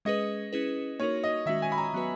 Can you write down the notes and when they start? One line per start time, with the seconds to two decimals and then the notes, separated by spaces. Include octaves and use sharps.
0.05 G#3 C#4 G#4 B4 D#5
0.53 C#4 E4 G#4 B4
1.00 A#3 D#4 F#4 A#4 C#5
1.24 D#5
1.46 D#3 G#3 C#4 F#4 E5
1.62 G#5
1.72 B5
1.78 A#5
1.94 F#3 B3 F#4 B4